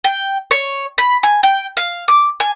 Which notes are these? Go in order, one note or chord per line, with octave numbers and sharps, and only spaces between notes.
G5
C#5
B5
G#5
G5
F5
D6
G#5